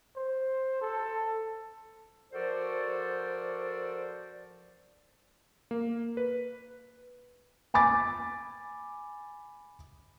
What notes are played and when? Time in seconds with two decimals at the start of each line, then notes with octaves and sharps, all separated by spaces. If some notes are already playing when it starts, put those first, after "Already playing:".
0.16 C5
0.82 A4
2.32 F3 F#4 A4 A#4 C5 D5
5.71 A#3
6.17 B4
7.74 G#5 B5 D6 A6